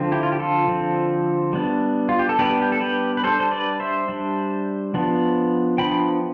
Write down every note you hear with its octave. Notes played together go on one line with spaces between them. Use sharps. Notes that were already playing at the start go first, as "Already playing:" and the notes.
Already playing: D3 F3 C4
E4 G4
F4
G4
F4 A4
D3 F3 C4
G3 B3 D4
F4
G4
A4
G3 B3 D4 G4 B4
G4
A4
G4 B4
B4
G3 D4 A4 C5
C5
B4 D5
C5 E5
G3 D4
F3 B3 D4
F3 B3 D4 G5 B5